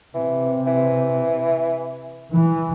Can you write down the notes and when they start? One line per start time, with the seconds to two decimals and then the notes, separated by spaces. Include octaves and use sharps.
0.14 C3 E3
0.67 E3
2.32 E3